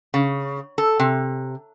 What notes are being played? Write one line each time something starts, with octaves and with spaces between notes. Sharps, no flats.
C#3
A4
C3